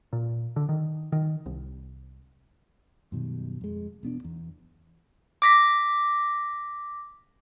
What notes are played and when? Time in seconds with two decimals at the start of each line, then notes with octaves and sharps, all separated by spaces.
0.13 A#2
0.56 D3
0.69 D#3
1.12 D#3
1.46 C2
3.12 F#2 B2 D#3 G3
3.61 F2 G#3
4.03 E1 B3 D4
4.24 E2
5.42 D6 A#6 B6